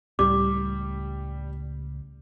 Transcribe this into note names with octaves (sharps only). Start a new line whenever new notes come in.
C#2 A2 C#3 G3 D6